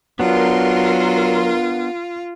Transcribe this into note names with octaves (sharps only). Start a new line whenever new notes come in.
F#3 B3 D4 F4 A#4 C6